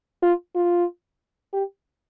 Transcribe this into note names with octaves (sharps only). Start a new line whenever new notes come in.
F4
F4
G4